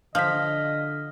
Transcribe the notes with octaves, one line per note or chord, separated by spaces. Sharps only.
D3 F3 D#5 F6 B6